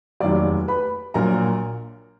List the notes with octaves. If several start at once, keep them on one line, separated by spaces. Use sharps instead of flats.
F1 D#2 D#3 F#3 D5 D6
B4 B5
A#1 A#2 F#3 A#3 A#4 A#5